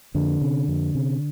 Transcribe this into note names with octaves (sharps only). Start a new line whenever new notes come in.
F2 D3
C3
F2
C3